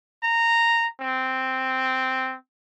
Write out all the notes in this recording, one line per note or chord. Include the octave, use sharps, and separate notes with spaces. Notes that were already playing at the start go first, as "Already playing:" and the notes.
A#5
C4